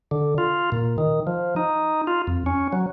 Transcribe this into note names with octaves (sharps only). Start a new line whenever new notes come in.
D3
F4
A#2
D#3
F3
D#4
F4
F2
C#4
F#3